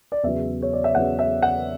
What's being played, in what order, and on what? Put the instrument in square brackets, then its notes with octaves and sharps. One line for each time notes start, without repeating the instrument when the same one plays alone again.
[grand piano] D5
E2 C#3 F#3 B3 E5
C#5
D5
E5
E2 C#3 F#3 B3 F#5
E5
F#5